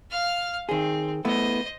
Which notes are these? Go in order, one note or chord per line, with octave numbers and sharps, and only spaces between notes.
F5 F6
D#3 C4 G#4
A3 B3 E4 C5 D#5